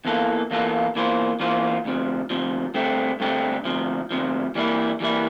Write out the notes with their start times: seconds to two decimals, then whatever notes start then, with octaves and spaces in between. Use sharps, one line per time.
0.05 E2 E3 A#3 F4 A4
0.51 E2 E3 A#3 F4 A4
0.95 E2 E3 A#3 F4 C5
1.40 E2 E3 A#3 F4 C5
1.85 D2 C3 F3
2.30 D2 C3 F3
2.74 G2 D3 A3 C4 G4
3.20 G2 D3 A3 C4 G4
3.65 D2 C3 F3
4.11 D2 C3 F3
4.55 E3 G3 A#3 E4
5.00 E3 G3 A#3 E4